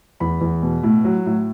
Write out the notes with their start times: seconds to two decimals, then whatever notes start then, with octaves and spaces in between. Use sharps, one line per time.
0.20 E2 B5
0.41 E2
0.63 B2
0.83 A2
1.05 F#3
1.26 A2